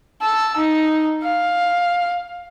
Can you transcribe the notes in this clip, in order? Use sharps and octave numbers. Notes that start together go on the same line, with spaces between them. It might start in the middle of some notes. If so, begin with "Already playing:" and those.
A5 E6
D#4
F5